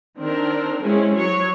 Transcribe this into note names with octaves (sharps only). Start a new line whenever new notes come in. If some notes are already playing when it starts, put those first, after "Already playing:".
D#3 C4 D4 A#4
G#3 C4 C#4 E4 G#4
F#3 C#5